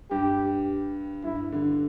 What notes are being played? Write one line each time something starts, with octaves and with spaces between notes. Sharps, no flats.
G2 G4
G2 E4
D3